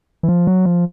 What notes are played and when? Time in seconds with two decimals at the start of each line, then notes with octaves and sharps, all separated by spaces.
0.23 E3
0.29 F3
0.47 F#3
0.66 F3